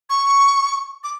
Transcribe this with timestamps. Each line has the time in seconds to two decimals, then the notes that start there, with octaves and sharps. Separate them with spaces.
0.10 C#6
1.04 D6